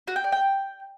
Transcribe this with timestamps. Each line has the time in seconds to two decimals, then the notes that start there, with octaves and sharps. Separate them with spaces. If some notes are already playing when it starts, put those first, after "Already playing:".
0.07 F#4
0.16 G5
0.24 D5
0.32 G5